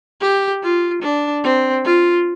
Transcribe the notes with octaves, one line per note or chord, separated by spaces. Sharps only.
G4
F4
D4
C4
F4